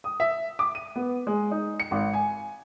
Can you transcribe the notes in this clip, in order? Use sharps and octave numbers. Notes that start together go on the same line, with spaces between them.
D#6
E5
D6
D#7
B3
G#3
D#4
C#7
G#1
G#5